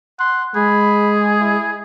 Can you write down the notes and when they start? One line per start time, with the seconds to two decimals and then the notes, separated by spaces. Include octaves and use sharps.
0.20 F#5 C6
0.56 G#3 G#4 B5
1.40 E4